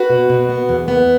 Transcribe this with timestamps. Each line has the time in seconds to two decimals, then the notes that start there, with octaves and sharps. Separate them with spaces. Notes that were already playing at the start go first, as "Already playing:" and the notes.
Already playing: F#4 B4
0.10 B2
0.30 B2
0.49 B3
0.69 E2
0.88 B3